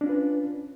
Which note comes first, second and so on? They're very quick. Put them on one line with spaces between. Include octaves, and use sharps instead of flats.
D4 C#4 F4 B4